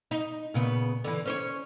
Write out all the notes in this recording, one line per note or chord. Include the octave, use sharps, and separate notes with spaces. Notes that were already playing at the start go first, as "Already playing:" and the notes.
D#4
A#2 C#3 B3
D3 E3
C#4 C5 C#5